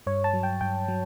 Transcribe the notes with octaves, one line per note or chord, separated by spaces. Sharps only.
G2 C#5
A5
F#3
G5
G2 G5
F#3